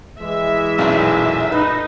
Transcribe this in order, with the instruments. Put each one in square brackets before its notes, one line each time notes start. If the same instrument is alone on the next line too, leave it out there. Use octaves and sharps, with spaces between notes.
[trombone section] E3 G#3 [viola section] E5
[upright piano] B1 F#2 [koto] A#2 A3
[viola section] D#4 [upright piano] B4